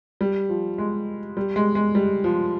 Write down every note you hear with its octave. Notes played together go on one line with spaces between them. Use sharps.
G3
F3
G#3
G3
G#3
G#3
G3
F3